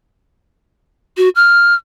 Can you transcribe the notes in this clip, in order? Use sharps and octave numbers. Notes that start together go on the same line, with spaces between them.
F#4
F6